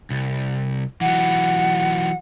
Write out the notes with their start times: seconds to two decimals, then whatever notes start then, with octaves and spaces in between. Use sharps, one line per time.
0.10 C2
1.01 E3 F#3 F#5